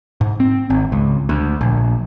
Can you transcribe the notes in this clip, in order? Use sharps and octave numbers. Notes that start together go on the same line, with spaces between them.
G#2
C4
G#1
C#2
D2
A#1